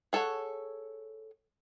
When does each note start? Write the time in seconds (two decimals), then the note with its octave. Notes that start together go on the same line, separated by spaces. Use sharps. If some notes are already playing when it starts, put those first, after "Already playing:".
0.13 G#4 A4 B4 C#5 F#5